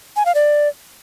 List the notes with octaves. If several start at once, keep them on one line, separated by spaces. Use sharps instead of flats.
G#5
F5
D5